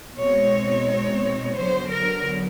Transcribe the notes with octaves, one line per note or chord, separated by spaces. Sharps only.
B2 G#3 C4 D#4 C#5
D3 F#3 B3 C5
A#4